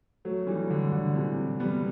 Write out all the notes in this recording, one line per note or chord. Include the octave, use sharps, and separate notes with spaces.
F#3 A3
E3 G3
D3
D3
C3 E3
G3 B3